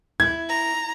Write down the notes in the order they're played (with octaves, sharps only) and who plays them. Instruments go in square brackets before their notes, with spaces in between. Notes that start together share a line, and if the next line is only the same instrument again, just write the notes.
[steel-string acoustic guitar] E4 [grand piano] G#6
[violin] A#5